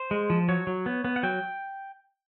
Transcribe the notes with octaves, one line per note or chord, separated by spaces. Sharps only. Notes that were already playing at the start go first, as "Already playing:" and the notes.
Already playing: C5
G#3
F3
F#3 C#5
F#3
B3
B3
F#5
F#3 G5